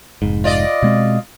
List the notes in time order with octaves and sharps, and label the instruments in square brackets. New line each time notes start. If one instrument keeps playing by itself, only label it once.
[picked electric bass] F1 G#2
[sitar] F4 D5 D#5
[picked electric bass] B2 G#3 C4